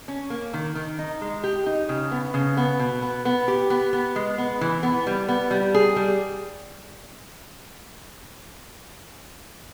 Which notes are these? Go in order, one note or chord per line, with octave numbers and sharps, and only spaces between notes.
C#4
A#3
D#3
D#3
D#4
G#3
G4
D#4
C#3
B3
C#3
B3
B2
B3
B3
G4
B3
B3
G#3
B3
E3
B3
G3
B3
G3
G#4
G3